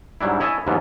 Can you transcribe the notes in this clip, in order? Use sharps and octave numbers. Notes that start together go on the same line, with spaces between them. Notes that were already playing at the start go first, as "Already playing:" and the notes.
G#2 F#3 G3 D4 E4
E4 C#5 D#5 E5 G#5 A5
D#2 G#2 E3 F3 B3